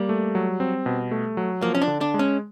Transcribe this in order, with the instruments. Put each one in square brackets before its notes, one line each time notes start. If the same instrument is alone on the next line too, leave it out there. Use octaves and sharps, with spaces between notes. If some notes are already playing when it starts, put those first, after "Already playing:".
Already playing: [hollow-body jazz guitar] G3 [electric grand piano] A#3
[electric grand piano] A3
F#3
C4
B2
A3
F#3
[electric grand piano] F3 [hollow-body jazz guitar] A#3
[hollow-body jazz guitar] C#4
D4
[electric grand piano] D3
[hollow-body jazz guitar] D4
[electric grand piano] G#3
[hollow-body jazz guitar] C#4